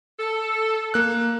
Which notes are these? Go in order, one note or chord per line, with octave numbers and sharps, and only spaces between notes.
A4
A#3 F#6